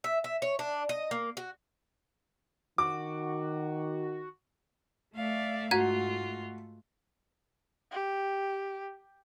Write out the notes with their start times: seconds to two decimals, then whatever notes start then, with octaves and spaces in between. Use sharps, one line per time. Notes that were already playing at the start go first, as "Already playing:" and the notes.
0.04 E5
0.24 E5
0.42 C#5
0.59 D4
0.89 D#5
1.11 A#3
1.37 F#4
2.78 D#3 F#4 D6
5.15 A3 D5 E5 F5
5.71 G#2 F4 F#4 F#5 A#5 G#6
7.92 G4